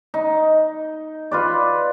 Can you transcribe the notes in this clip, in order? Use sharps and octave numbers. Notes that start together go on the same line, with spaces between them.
D#4
F4 B4 D5